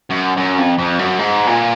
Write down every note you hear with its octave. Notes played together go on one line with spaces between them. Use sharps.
F#2
F#2
F2
F2
F#2
G#2
A#2